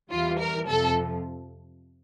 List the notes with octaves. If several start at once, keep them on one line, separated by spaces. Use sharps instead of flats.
E2 E3 G3 F4
A#4
F2 C3 F3 A4